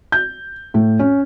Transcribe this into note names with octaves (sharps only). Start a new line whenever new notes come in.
G6
A2
C#4